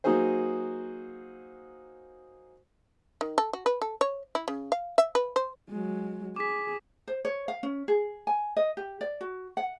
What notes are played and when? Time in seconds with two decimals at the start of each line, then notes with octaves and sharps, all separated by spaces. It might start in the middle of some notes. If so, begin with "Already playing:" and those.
0.04 F#3 A#3 D#4 F#4 G#4 C5
3.21 D#3
3.38 A4
3.53 F#4
3.66 B4
3.81 A4
4.01 C#5
4.35 E4
4.48 C#3
4.72 F5
4.98 E5
5.15 B4
5.36 C5
5.69 F#3 G#3
6.36 G#4 D6 B6
7.08 C5
7.25 C#5
7.48 F5
7.63 C#4
7.88 G#4
8.27 G#5
8.57 D#5
8.77 G4
9.01 D5
9.21 F#4
9.57 F#5